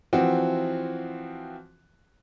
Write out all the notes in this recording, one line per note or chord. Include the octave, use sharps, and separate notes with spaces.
E3 F3 C4 F#4